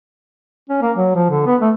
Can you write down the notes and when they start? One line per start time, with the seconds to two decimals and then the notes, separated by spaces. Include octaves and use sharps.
0.70 C#4
0.82 A#3
0.97 F#3
1.16 F3
1.31 D3
1.47 B3
1.62 A3